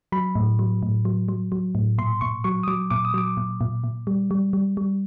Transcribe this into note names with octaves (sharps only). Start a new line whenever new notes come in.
F#3 B5
A2
F#3
A2
F#3
F#3
F#3
A2
A#2 C6
A#2 C#6
F#3 C#6
D#6
F#3 D6
A#2 D6
D#6
F#3 D6
A#2
A#2
A#2
G3
G3
G3
G3